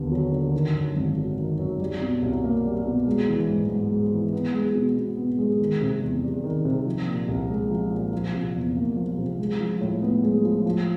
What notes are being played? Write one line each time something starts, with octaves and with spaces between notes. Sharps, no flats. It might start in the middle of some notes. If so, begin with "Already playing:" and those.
Already playing: D#2 D3 B3
F#3
D3
D#3
F#2
G#1
F#3
D#3
F#2
G3
B2
C2
A#3
G3
B2
G#3
E3
G#2
G#2
G#3
E3
B3
G#3
B2
B2
B3
G#3
D#3
C3
E2
G3
D#3
C3
F3
A#2
C2
G#3
F3
A#2
F3
C3
E2
A#3
F3
C3
G#3
F3
A2
B3
G#3
F3
F3